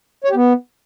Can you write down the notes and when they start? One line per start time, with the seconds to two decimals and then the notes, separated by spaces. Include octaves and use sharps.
0.24 C#5
0.30 G4
0.35 B3